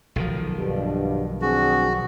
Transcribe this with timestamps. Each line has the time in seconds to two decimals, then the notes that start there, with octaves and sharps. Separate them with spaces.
0.16 B1 D#3 F3
0.58 G2 B2
1.42 C4 D4 F#4 G#4